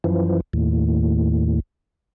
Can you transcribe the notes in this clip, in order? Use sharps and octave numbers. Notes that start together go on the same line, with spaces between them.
F#2 E3 F3
D#2 A2